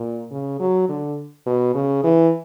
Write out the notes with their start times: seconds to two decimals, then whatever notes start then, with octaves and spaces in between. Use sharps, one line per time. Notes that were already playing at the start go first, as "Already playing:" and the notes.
Already playing: A#2
0.31 C#3
0.60 F#3
0.89 D3
1.46 B2
1.75 C#3
2.04 E3